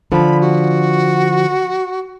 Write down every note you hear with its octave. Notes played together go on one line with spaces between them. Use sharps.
D3 F3 B5
F#4